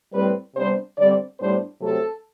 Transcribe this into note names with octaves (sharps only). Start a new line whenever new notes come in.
A2 G3 C4 B4
C3 G3 B3 D4 C5
D3 G3 C4 D5
A2 G3 B3 D4 C5
C3 F#3 A3 C4 A4